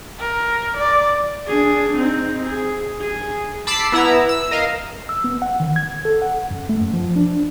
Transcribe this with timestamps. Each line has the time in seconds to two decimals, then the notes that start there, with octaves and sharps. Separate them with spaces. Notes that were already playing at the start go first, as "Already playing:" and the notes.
0.20 A#4
0.77 D5
1.47 D4 G#4
1.97 C4 D#4
2.46 G#4
3.00 G#4
3.67 A5 B5 D6 E6 C7
3.92 B3 E4 A#5 E6
4.29 E6
4.51 A#4 D#5 F5
5.09 E6
5.24 B3
5.42 F#5
5.60 D#3
5.76 G#6
6.05 A4
6.22 F#5
6.51 F#2
6.69 A3
6.81 F#2
6.93 F3
7.16 D4